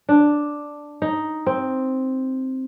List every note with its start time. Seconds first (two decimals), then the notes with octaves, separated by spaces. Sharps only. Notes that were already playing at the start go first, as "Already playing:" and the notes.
0.09 D4
1.02 D#4
1.46 C4